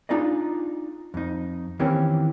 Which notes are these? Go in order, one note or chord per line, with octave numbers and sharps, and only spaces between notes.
D4 D#4 F4 G#4 D5 D#5
F2 D#4
D#3 E3 A#3 C4 C#4 G4